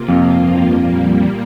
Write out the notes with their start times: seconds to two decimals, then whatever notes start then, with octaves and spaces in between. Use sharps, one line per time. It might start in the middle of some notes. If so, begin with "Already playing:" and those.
Already playing: C3 A#3 F4
0.08 F2
0.31 G2 F3 A#3 F4
0.76 A#2 G3 A#3